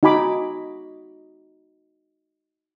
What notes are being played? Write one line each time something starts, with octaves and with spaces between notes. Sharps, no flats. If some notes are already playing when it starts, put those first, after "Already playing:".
D#4 F#4 G#5 B5 D6